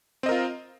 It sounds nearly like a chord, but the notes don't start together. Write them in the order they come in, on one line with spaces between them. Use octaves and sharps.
C4 D#5 A#4 F4